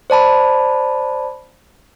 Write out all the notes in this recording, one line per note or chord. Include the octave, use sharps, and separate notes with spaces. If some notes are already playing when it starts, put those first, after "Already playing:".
C5 D5 A5 B5